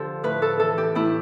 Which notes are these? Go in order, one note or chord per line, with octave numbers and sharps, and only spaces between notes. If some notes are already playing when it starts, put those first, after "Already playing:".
Already playing: D3 F3 F4 G4 A4
A2 B4
A4
E3 A4
G4
A2 E4